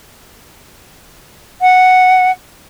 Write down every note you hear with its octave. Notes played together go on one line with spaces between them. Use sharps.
F#5